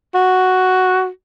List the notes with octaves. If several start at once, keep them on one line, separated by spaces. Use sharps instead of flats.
F#4